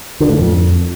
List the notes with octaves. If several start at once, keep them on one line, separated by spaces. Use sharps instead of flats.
D3
A2
F2